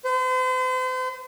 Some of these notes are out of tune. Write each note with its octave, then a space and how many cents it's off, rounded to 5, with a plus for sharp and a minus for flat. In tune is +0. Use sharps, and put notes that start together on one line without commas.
C5 -40